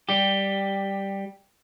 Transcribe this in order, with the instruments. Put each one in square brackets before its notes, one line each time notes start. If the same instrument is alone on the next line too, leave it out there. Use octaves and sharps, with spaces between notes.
[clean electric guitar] G3 G4